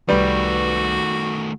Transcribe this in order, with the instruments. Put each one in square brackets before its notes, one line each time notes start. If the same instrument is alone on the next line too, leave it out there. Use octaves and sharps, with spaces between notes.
[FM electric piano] C2 B4 [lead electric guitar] D#3 A3 [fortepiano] G3 [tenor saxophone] F#4